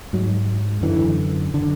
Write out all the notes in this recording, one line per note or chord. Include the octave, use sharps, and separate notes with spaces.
G#2 F#3
F#2 D3 E3
D3